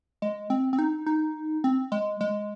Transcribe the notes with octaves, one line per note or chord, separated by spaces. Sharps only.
G#3
C4
C4
D#4
D#4
C4
G#3
G#3